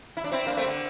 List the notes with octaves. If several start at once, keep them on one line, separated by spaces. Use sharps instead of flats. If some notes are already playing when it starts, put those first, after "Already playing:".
E4
D4
C4 E4
A#3 D4
A3 C4
D3